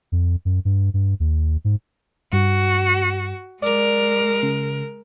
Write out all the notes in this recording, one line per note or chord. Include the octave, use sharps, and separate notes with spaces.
F2
F#2
G2
G2
D#2
G#2
G2 F#4
G#3 A#4 D5
C#3